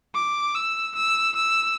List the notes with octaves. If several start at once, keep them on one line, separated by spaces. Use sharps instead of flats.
D6
E6
E6
E6